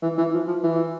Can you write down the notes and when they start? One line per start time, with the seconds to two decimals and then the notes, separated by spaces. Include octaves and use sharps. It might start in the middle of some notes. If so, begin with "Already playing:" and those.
0.02 E3
0.18 E3
0.33 F3
0.48 F3
0.64 E3